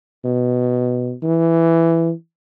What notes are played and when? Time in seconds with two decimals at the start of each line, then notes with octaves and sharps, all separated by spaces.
0.25 B2
1.23 E3